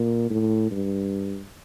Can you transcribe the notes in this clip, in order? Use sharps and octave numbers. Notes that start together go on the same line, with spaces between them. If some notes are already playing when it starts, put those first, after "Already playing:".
Already playing: A#2
A2
G2